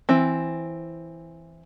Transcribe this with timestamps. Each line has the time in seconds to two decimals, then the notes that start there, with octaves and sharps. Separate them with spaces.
0.09 E3 C4